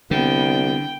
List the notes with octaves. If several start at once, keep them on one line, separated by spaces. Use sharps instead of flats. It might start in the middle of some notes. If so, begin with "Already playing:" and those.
C2 D3 B3 G5